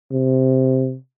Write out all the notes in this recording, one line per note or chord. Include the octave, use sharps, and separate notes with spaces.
C3